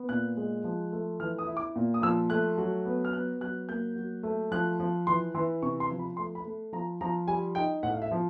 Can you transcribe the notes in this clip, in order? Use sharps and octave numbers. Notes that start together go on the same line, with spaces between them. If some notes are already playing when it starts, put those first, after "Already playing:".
Already playing: B3
A#2 F#6
G#3
F3
A3
E3 F6
D#6
E4
D6
A#2
D#6
F3 E6
A3 F#6
F#3
B3
F6
B3 F#6
F#3 F#6
A#3 G6
F#3
A3
F3 F#6
F3
E3 C6
E3 C6
C3 C#6
C6
F3
B5
A3 C6
B5
A3
F3 A#5
F3 A#5
G3 G#5
D#4 G5
A2 F#5
F5
E5
F3